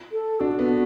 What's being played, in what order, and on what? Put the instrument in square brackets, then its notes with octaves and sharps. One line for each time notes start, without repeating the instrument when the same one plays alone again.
[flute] A4
[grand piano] D4 [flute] F#4
[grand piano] B3